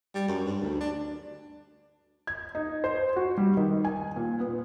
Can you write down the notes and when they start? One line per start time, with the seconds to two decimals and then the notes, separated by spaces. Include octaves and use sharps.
0.15 G3
0.28 F#2
0.45 G2
0.62 D2
0.81 D4
2.27 G#6
2.55 D#4
2.84 C5
3.16 F#4
3.38 G3
3.57 D#3
3.85 G#5
4.16 A#2
4.40 B3